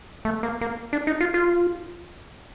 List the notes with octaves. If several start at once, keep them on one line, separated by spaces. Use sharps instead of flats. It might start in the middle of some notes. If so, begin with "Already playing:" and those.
A3
A#3
A#3
D4
D#4
F4
F4